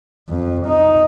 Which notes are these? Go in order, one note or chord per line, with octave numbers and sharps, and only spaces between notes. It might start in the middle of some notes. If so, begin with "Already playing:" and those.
F2
D#4